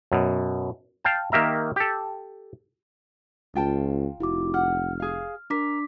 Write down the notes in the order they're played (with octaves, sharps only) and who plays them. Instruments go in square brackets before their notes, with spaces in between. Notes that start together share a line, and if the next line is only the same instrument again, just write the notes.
[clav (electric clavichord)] F#2 B2
F5 G5 A5
D#3 A#3 G4 E5 A#5
G4 A4
[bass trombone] C#2 [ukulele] F4 G5 A5
[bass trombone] F1 [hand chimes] E4 F#4 D6
[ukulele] F#5 [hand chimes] F6
[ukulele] G#4 F5
[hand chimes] D4 D6 B6 [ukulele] A#4